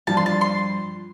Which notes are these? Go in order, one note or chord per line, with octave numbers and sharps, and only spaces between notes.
G2 F3 D4 A5
C6
A5
C6